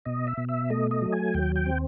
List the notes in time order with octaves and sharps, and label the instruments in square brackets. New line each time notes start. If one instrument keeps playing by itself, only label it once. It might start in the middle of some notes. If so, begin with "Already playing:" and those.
[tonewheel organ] B2 D#5
E5
B2
E5
A3 D#5
D#5
F#3
G#5
D#2 G5
G5
C4